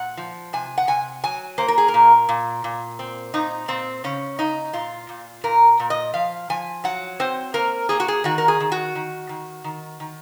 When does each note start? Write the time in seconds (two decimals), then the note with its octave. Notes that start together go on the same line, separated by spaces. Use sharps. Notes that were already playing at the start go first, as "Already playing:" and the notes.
Already playing: A#2 F#5
0.17 F3
0.53 C3 G#5
0.78 F#5
0.87 C3 G#5
1.24 F#3 G#5
1.58 A#3 C5
1.68 A#4
1.78 G#4
1.88 A#4
1.94 A#2
2.29 A#2
2.64 A#2
2.99 C4
3.34 A#2 D#4
3.68 A#2 C4
4.04 C#3 C#4
4.39 C#3 D#4
4.73 A#2 F4
5.09 A#2
5.44 A#2 A#4
5.80 A#2
5.90 D#5
6.14 F3 F5
6.50 F3 G#5
6.84 F#3 F#5
7.20 C4 C5
7.54 A#3 A#4
7.89 A#3 G#4
8.00 F#4
8.08 G#4
8.24 D#3 F#4
8.38 A#4
8.48 G#4
8.60 D#3
8.72 F#4
8.95 D#3
9.29 D#3
9.64 D#3
10.00 D#3